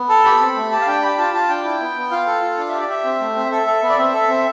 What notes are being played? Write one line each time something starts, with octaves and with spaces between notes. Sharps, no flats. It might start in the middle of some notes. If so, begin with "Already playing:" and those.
Already playing: B3
A4 A5
G4 B5
C4
A3
G4 A5
F5
D4 G5
G4 B5
F4 A5
F4 A5
D4 G5
E4
B3
B3
F4 F5
A4
F4
D4 F5
G4 E5
D5
G4 E5
C4
A3
C4
A4 E5
A4
B3
D5
C4 E5
A4
C4